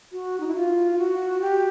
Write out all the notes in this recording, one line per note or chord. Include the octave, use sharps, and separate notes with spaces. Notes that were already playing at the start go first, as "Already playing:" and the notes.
F#4
D#4
E4
F4
F#4
G4